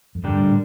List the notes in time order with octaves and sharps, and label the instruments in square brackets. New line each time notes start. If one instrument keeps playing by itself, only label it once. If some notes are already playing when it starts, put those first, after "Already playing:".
[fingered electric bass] F2
[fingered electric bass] G2 [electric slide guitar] D3 G3 D4 G4 A#4
[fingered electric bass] A2